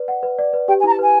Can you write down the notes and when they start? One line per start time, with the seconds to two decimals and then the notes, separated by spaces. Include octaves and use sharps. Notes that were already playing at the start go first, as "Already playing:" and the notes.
Already playing: B4 D5
0.08 F#5
0.23 B4
0.39 D5
0.53 B4
0.68 G4 G5
0.80 G#5
0.84 E4 A#5
0.92 A5
0.99 B4 G#5